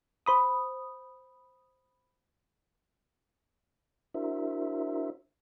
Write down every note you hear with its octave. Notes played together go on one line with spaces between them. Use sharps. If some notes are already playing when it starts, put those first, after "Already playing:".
C5 B5 D#6
D4 E4 F#4 A#4 C5 E5